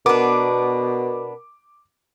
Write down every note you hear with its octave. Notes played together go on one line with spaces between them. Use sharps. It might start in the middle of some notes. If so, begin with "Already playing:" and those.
B2 B3 D4 A#4 D6